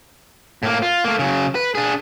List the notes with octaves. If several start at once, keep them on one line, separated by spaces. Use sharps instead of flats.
A2 A#3
F4
A3 A#3
C#3 F#3
B4
D4 G#4